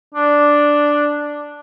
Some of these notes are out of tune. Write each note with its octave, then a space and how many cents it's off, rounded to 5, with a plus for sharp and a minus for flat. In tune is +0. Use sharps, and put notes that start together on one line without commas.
D4 +0